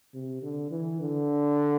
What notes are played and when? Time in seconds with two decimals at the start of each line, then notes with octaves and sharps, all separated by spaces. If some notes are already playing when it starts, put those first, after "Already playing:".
0.14 C3
0.43 D3
0.71 E3
1.00 D3